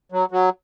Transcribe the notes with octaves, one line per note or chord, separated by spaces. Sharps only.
F#3
F#3